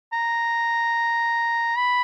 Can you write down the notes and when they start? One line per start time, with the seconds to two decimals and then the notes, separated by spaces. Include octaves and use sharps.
0.13 A#5
1.77 B5